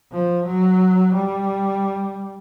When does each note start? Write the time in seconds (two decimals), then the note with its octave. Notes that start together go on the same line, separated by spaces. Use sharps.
0.12 F3
0.46 F#3
1.14 G3